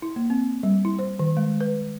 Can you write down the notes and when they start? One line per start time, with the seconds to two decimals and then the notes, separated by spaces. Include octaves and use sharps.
0.02 E4
0.16 A#3
0.30 C4
0.63 G3
0.85 E4
0.99 C5
1.19 D#3
1.37 G#3
1.61 B4